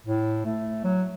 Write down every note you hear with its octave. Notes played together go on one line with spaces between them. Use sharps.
A2
A3
F#3